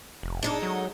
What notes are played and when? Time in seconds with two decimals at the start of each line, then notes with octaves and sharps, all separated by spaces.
0.23 F1
0.43 G#3 D4 D#4 A4
0.62 F#3